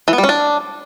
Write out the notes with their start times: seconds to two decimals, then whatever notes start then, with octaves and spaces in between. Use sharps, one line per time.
0.08 E3
0.13 B3
0.18 G3
0.24 C#4
0.29 D4